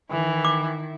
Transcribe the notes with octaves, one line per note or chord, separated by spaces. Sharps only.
D#3 E3 E4
D6